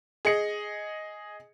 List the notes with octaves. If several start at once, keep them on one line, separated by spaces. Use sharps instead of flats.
G#4 D#5 C#7